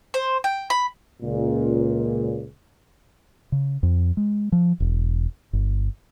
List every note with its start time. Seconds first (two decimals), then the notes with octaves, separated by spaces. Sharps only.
0.14 C5
0.44 G5
0.70 B5
1.22 C#2 A#2
3.52 C#3
3.83 F2
4.17 G#3
4.52 F3
4.80 E1
5.53 G1